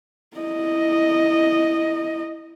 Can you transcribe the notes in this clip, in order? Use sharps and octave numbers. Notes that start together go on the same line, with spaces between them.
E4 D#5